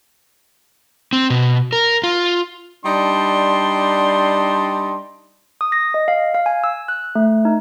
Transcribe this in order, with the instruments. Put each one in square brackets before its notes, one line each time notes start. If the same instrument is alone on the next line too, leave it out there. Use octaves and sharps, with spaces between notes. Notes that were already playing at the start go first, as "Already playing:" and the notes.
[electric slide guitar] C4
B2
A#4
F4
[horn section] G3 D4 D#4 A5 C6
[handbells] D#6
A#6
D#5
F5
F5
G#5
E6
F#6
A3
D#4